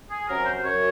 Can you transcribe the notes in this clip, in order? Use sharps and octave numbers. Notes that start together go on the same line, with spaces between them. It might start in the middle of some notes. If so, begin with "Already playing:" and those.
G#4
C3 F#3 C#4 A#4
C5
F#2 C#5